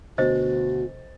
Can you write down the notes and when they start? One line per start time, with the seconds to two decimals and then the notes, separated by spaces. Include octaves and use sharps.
0.18 D2 B2 F#4 C5 D#5 A6